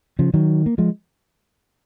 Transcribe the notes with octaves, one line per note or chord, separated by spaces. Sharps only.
C#3 F3
D#3 F#3
A#3
F3 G#3